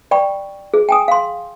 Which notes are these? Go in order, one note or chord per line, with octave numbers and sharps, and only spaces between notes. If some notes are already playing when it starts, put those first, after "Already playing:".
D5 G5 B5 C#6
G#4
G5 G#5 D#6
F5 C6